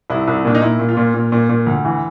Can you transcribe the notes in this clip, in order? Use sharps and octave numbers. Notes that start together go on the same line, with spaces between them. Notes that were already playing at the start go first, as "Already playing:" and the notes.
C2 E4
C2
A#2 D4
D#4
A#2 E4
A#2
F4
A#2
A#2
A#2
A#2
D2
E3